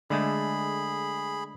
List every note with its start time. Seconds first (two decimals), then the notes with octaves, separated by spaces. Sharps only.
0.10 D3 G#3 A3 G#4 B5